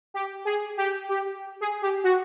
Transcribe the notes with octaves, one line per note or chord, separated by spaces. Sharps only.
G4
G#4
G4
G4
G#4
G4
F#4